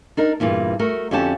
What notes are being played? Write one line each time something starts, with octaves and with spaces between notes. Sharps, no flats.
D4 D#4 A#4
E2 G2 A#2 E3
A3 F#4 A#4
F2 D3 C#4 F#4 G4 A5